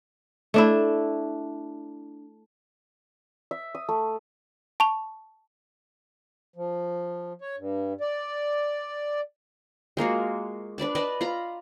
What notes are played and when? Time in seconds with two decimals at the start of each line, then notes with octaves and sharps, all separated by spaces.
0.54 A3 D4 E4
3.51 E5
3.75 D#6
3.89 A3
4.80 A5 C#6 F7
6.56 F3
7.41 C#5
7.58 G2
8.01 D5
9.97 G#3 A#3 F4 F#4
10.78 D4 B4 D5 A5
10.95 B4 D5 D#5 A5
11.21 F4 A#5 B5